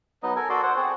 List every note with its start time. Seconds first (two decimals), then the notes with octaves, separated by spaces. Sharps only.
0.23 F#3 B3 D#4 D#5
0.36 A4 A#4 G#5
0.50 F#4 A4 D5 C6
0.63 C5 F#5
0.76 C4 F#4 G#4